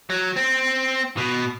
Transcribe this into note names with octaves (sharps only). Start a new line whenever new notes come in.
F#3
C4
B2